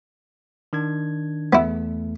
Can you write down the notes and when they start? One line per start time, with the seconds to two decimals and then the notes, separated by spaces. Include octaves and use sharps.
0.73 D#3 D4 G#6
1.53 E2 A3 B3 E4